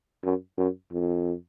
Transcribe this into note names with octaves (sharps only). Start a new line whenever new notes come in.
F#2
F#2
F2